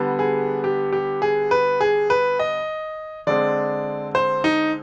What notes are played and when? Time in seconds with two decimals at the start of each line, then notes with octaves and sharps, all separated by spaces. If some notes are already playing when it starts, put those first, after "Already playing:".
Already playing: D3 G3 B3
0.19 G#4
0.64 G4
0.93 G4
1.22 G#4
1.51 B4
1.81 G#4
2.10 B4
2.39 D#5
3.27 D3 G#3 C4 D5
4.15 C5
4.44 D#4